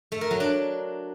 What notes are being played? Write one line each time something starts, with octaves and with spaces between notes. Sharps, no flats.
A3
A#4
F#3
D4